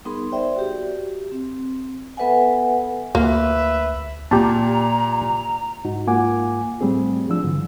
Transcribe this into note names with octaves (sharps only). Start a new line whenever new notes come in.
G3 B3 D#4 G#4 A#4 C6
G#4 C5 D5 E5 G5
F#4 G4
C4
B3 A4 B4 E5 F#5 G#5
D2 A#3 B4 E5
A#2 G4 A5 A#5
G#2 D#4 F#4
G#2 A#3 F4 F#5 G#5 D6
A2 G3 A3 C4 G#4
F3 D4 E6
G2 D3 E3